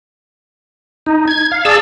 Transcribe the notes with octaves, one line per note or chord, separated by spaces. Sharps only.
D#4
G#6
F5
G#4 D5 A5 E6